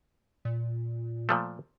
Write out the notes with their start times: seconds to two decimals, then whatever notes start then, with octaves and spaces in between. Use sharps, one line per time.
0.45 A#2
1.29 A#2 F3 A3